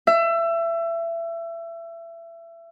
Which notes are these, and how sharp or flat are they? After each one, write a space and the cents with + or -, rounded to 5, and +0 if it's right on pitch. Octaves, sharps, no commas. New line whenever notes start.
E5 +25